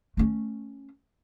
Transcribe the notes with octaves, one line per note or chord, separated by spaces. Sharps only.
A3 C#4